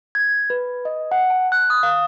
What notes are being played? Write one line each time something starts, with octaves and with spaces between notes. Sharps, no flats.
G#6
B4
D#5
F#5
A5
F#6
D#6
F5